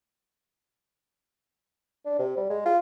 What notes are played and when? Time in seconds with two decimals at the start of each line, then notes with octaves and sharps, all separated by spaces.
2.05 D4
2.19 C3
2.37 G3
2.50 G#3
2.65 F4